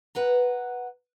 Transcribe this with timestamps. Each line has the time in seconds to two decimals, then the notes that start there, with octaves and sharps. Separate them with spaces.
0.15 B4 F#5 A#5